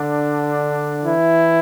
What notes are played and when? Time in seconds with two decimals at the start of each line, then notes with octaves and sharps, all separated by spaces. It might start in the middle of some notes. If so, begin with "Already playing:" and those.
Already playing: D3 D4
1.04 E3 E4